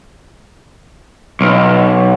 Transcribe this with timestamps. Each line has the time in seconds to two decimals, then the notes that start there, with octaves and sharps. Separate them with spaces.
1.41 B1